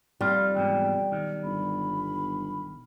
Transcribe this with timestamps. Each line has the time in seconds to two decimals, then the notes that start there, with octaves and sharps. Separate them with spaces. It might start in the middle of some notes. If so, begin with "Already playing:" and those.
0.21 F1 G3 F4
0.55 E2 G#2 B2 G5
1.12 B1 D#3
1.44 G1 B5